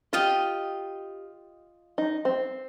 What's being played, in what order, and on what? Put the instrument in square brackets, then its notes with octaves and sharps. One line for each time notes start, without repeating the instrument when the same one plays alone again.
[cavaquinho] F4 D#5 G5 [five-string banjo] G4
[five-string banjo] D#4
C4